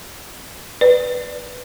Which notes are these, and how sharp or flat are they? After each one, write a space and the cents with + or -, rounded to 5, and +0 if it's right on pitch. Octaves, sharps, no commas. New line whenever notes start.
B4 +0 D5 +0